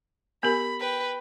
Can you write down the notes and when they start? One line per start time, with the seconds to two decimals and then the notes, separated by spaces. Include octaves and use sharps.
0.43 B3 G4 A#4 B5
0.80 B4 G5